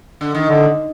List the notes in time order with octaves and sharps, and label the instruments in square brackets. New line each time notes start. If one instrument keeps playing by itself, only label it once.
[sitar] D3
D#3
[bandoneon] D3